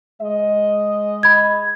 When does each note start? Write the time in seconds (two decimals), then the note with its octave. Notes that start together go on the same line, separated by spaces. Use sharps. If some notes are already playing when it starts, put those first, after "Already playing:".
0.22 G#3 D#5
1.23 B5 G#6